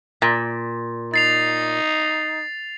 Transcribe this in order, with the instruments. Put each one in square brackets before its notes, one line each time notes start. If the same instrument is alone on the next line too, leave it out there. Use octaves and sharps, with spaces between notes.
[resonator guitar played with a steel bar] A#2
[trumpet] D#4 [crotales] A6 C7 F7